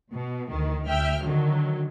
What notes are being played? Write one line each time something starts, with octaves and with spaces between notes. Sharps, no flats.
B2
D2 D#3
D2 E5 G5 F6
D3 D#3 F#3